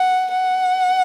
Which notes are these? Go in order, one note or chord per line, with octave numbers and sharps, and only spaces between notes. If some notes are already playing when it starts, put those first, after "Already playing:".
Already playing: F#5
F#5